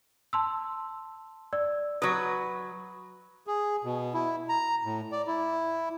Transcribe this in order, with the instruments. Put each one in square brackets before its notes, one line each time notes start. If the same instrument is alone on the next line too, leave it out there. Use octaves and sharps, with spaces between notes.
[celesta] A5 C6 E6
D5 E6
[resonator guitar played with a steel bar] F#3 B4 [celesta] D#6
[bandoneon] G#4
B2
E4
A#5
A2
D5
E4